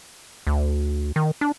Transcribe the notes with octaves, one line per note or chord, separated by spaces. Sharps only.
D2
D#3
D4